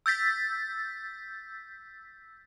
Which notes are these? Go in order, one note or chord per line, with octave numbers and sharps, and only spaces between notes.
E6 G6 A6 B6